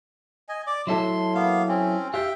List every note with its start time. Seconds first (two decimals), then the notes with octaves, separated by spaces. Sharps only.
0.49 D#5 G#5
0.67 D5 D6
0.87 F#3 E4 A4 C6
1.35 A#3 B3 F5
1.69 C4 C#4
2.14 G4 E5 F5 G5